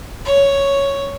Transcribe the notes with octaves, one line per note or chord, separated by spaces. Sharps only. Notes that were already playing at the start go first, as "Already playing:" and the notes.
C#5